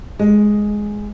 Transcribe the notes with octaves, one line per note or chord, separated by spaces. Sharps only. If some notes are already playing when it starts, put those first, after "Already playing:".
G#3